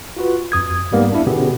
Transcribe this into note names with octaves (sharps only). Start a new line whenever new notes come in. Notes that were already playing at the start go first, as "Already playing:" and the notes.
F4 F#4 B4
F2 D#6 G#6
G#2 G3 A#3 B3
D4 E4
B2 D3 B3 C#4 G4 G#4